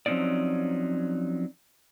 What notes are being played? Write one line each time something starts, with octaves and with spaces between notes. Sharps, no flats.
F3 F#3 C4 C#4 D#4 D5